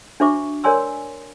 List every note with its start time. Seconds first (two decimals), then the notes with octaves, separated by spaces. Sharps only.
0.20 D4 F#4 C5 E5 C#6 D6
0.64 A#4 C#5 D5 G#5 C6 E6